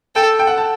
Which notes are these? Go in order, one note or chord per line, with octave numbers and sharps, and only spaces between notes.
A4 G5
G5
F#5
A5